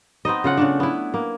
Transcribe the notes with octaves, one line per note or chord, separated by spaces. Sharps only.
B3 C4 D#4 D#5
C#3 F4 F#5
C#3 A3 D4
B3 E4
A#3